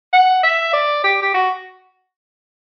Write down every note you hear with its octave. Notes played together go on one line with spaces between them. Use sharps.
F#5
E5
D5
G4
G4
F#4